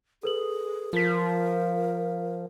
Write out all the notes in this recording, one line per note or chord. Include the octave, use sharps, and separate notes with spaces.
G#4 A4 B4 F#7
F3 F4 A#4 B6